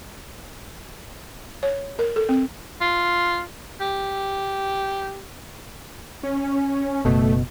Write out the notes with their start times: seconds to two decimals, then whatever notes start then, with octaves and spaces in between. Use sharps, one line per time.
1.63 C#5
1.99 A#4
2.16 A4
2.29 C4
2.81 F4
3.80 G4
6.23 C#4
7.05 F#1 B2 A3